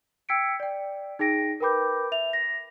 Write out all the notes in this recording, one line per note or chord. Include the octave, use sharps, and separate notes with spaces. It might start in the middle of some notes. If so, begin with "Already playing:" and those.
G5 E6 G#6 B6 C#7 D7
D5 G5
D#4 G#4 G5 A#6 D7
A#4 B4 G5 B5 D6 G6
E5 F7
A#6